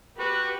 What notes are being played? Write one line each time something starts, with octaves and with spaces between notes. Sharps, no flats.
F#4 G4 B4